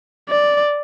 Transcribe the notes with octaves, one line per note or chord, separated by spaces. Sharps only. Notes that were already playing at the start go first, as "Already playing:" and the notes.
D5